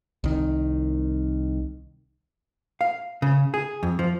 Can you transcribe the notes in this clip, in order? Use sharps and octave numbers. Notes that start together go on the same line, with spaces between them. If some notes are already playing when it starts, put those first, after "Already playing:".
C2 D#3
F5
C#3
G#4
F2
F3